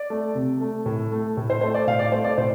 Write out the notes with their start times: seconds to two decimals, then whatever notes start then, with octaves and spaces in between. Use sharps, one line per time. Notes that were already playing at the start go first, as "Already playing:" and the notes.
Already playing: D5
0.10 A3
0.35 C3
0.61 A3
0.86 A2
1.12 A3
1.37 A2
1.50 C5
1.61 A3 C5
1.75 D5
1.87 A2 F5
1.99 D5
2.12 A3 C5
2.24 D5
2.38 A2 C5